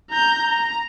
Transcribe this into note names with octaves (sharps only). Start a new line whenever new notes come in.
A#5 G6
A#5